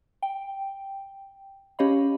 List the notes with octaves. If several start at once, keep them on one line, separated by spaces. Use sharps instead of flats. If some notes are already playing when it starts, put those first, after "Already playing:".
G5
C#4 G4 C#5 D#5 F5 B5